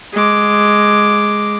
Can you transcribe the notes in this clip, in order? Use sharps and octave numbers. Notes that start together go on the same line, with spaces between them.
G#3 D6